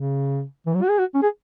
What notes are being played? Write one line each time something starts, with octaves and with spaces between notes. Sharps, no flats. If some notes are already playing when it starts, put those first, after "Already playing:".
Already playing: C#3
E3
F#3
F#4
G#4
F#4
C#4
G#4